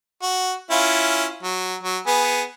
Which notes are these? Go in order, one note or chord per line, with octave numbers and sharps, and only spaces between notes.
F#4
C#4 E4 F4
F#3
F#3
B3 G#4